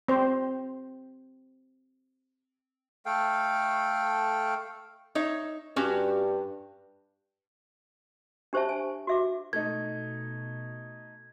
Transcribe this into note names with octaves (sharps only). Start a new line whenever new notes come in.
C4 C5
A3 A4 F5 G5
D#4 C#5 E5
G2 C#4 F#4 G4
D4 G4 C5 C#5 E5 A5
G#5
F#4 E5 D6
B2 A3 D#4 G#6